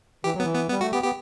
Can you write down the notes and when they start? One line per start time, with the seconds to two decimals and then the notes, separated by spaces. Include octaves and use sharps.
0.24 E3 G4
0.34 F#3
0.40 B3
0.43 E3
0.55 B3
0.70 G3 B3
0.81 A3 F#4
0.93 B3 G4
1.04 B3 G4